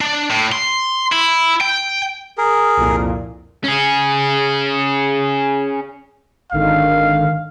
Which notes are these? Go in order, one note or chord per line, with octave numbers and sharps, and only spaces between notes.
D4
A2
C6
E4
G5
G#4 A#4
C2 F2 A#2
C#4 G#4
G#1 D3 D#3 F5